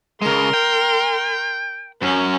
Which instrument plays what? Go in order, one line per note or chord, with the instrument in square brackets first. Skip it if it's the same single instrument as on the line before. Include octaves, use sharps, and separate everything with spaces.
[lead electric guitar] C#3 G#3 [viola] A#4 C6
[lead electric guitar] G5
[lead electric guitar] F#2 [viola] C#4